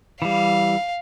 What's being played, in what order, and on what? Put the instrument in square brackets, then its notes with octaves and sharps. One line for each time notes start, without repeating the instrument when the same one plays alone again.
[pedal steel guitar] E3 G3 [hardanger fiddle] F5